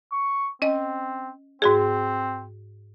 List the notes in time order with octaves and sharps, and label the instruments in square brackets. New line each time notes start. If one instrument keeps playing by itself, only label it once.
[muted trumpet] C#6
[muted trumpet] C4 [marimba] C#4 D#5
[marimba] G#2 F#4 G#4 [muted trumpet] C4